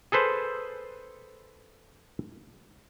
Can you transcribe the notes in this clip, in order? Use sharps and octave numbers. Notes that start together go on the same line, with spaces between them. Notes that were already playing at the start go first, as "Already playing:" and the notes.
G#4 A4 B4 C5